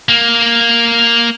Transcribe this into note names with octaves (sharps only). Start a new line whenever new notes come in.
A#3